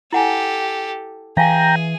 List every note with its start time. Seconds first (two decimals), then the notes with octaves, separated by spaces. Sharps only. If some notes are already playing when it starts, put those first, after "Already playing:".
0.13 E4 G4 A4 F#5 G#5
1.37 E3 G#4 F5 G5 G#5 A#5